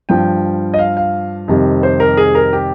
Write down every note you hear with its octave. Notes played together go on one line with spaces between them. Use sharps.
G2 F3 G5
D#5
F5
F5
F2 C3 D#3 G3
C5
A#4
G#4
A#4
G4